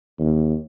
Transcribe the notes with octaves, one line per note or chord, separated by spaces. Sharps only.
D#2